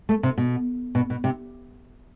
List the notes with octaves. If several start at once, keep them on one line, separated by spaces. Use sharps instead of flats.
A3
C3
B2
B2
B2
C3